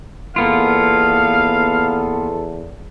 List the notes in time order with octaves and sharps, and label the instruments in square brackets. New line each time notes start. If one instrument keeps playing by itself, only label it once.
[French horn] E2 [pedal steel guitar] A#3 B3 F4 [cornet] A4 [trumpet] F5